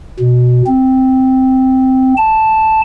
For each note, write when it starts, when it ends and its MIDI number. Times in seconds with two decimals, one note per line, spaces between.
0.20 0.62 47
0.67 2.14 60
2.17 2.82 81